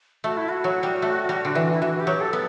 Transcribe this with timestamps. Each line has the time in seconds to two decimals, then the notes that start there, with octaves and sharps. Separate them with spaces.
0.24 A3 F#4
0.37 E4
0.49 F#4
0.64 F#3
0.83 G3
1.02 A3
1.29 G3
1.45 D3
1.55 E3
1.73 E4
1.82 E3 F#4
2.00 G4
2.07 F#3
2.21 A4
2.33 B3